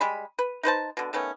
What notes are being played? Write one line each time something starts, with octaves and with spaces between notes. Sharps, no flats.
G3 G#3 B5
B4
D#4 B4 C5 A5
B2 D3
D#3 A3 B3 C#4